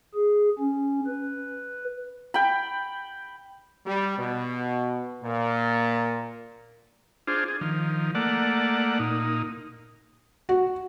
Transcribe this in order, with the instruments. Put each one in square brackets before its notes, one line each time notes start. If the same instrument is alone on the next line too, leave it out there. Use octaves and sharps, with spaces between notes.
[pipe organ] G#4
C#4
B4
[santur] G5 B5
[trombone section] G3
B2
A#2
[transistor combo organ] D4 F4 G#4 C5
G#4
D#3 F3
A3 A#3 D5 F#5
A#2 D#4
[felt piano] F#4